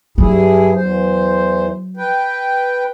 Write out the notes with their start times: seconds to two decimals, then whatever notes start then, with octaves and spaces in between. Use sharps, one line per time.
0.18 G2 F#3 E4 G#4
0.74 E2 C5
1.97 B4 G5